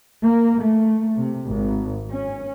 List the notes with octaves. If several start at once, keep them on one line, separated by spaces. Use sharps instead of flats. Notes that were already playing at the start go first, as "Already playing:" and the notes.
A#3
A3
C3
G#1
C#4